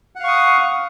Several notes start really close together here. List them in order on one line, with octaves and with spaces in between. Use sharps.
F#5 F5 C#6 D#6